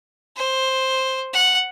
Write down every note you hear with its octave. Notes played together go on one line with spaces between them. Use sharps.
C5
F#5